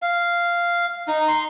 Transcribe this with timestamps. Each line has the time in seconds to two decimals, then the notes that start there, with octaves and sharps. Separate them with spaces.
0.02 F5
1.08 D#4
1.28 C6